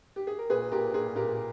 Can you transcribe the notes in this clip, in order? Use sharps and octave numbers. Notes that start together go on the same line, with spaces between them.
G4
G#4
A#4
A#2 G#4 B4
A#2 G4 A#4
A#2 G#4
A#2 G4 A#4